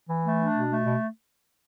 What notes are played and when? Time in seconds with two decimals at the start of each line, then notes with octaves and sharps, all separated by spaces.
0.08 E3
0.24 A3
0.38 D4
0.54 B2
0.70 A3
0.84 B2